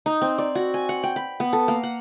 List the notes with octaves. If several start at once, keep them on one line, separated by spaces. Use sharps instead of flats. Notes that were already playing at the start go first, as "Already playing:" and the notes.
D#4
C4
D5
F#4
G#5
F#5
G5
B5
B3
A4
A#3
F#5